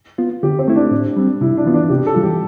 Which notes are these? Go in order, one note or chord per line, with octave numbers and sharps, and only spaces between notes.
B3 F4
D3 G4
C4
A3 E4
D4
A2
G3 C4
C3 E4
D4
E3 B3 F4
D4
C3 G4
A4
E3 G3 D4 F4
G4